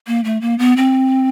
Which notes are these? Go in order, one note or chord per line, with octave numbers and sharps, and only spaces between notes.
A#3
A3
A#3
B3
C4